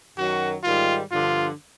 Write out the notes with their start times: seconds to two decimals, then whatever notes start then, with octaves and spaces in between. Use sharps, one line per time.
0.17 F#2 D#3 F#3 F#4
0.64 G#2 D#3 G3 F4
1.12 G2 D3 F3 F4